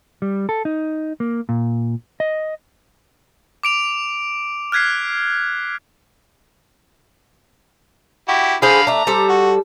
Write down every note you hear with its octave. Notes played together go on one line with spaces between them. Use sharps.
G3
A4
D#4
A#3
A#2
D#5
D6 D7 F7
F6 F#6 G#6 B6 C7
E4 F#4 G4
D3 G#4 C5 F5 B5
A3 D4 A#5
G3 A4 C5
F#4